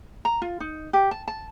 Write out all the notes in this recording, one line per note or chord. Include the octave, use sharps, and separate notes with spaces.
A#5
F4
D#4
G4
A5
A5